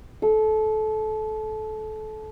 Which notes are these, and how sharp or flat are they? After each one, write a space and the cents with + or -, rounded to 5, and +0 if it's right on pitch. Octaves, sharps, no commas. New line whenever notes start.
A4 -25